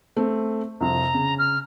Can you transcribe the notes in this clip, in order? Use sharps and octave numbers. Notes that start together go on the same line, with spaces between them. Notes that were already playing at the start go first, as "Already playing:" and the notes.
A3 C4
C2 F2 A#5
C#3
F6